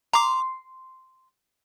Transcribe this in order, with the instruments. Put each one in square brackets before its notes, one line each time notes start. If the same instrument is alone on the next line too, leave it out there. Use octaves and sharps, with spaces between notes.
[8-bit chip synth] A#5 D6 [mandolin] C6